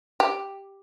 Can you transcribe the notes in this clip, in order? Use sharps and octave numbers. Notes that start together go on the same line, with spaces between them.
G4